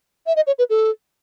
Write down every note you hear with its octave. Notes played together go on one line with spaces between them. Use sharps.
E5
D#5
C#5
B4
A4